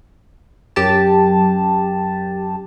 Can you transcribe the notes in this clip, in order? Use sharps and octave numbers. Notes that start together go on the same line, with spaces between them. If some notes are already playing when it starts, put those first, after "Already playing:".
F#2 G4 A5